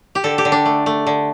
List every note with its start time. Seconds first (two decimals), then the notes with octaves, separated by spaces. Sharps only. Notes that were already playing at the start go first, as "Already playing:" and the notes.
0.15 G4
0.24 D3 A4
0.38 G4
0.45 D3
0.52 D4
0.65 A3
0.86 A3
1.07 D3